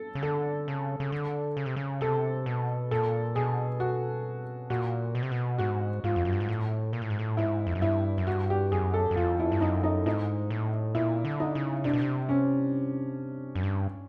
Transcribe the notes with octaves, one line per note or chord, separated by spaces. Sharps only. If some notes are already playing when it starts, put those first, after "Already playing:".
Already playing: A4
C#3
D3 A4
C#3
C#3
D3
C#3
C3
C#3
C3 A4
B2
A#2 A4
B2 G#4
F#4
A#2 F#4
B2
C3
B2
G#2 F#4
G#2 F4
F2
F#2
G2
G#2
A2
A#2
A2
G#2
A2
G#2 E4
F2
F#2
G2 E4
F#2
G2 F#4
G4
F#2 G#4
A4
F#2
F2 F4
E4
G2
F#2 D#4
D#4
G#2 D#4
A2
A#2 E4
D3
D#4
C#3
C3 D4
B2
C3
C#4
F#2
G2